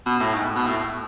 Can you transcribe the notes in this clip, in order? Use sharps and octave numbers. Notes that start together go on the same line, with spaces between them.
B2
A2
G#2
B2
A2